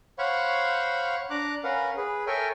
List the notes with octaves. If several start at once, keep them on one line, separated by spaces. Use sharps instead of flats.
C5 C#5 F5 F#5 B5 C#6
D4 A#5 D6 F#6
C#4 A#4 B4 F5 F#5
G#4 B4
A4 A#4 C#5 E5 G5 G#5